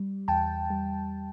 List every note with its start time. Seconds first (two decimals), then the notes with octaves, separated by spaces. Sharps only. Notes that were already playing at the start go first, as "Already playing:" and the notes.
Already playing: G3
0.28 E2 G5 A5
0.70 G3